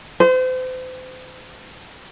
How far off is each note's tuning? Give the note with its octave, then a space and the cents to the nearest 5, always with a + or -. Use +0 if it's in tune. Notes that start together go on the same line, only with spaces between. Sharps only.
C5 -35